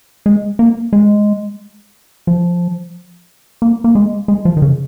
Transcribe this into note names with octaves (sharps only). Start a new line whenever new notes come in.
G#3
A#3
G#3
F3
A#3
A#3
G#3
G#3
F3
D#3
C#3